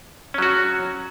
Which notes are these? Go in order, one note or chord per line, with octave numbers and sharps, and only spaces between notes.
F#3 C#4 F#4